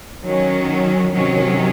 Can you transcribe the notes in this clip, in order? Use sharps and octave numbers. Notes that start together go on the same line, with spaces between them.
D#3 F#3 C#4
C3 D#3 F#3 C#4